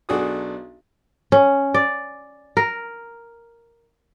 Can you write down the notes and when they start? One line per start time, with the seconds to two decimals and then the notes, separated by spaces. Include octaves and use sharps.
0.09 B1 D4 F#4 G#4 A4 D#6
1.32 C#4
1.74 D5
2.57 A#4